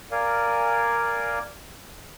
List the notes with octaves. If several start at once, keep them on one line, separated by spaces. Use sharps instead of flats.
A#4 D5 F5 G#5